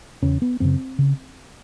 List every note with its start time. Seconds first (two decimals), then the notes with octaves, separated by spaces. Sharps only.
0.22 E2 C#3 C#4
0.42 B3
0.60 F#2 C#3 C4
0.99 C#3